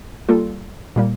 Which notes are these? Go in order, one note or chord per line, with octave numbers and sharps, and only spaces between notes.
G3 A#3 F4 A4
A#2 G3 A#3